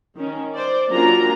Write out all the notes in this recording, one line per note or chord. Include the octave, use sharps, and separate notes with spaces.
D#3 C#4
C5 D5
F#3 A#3 C#4 D4 F4 A#5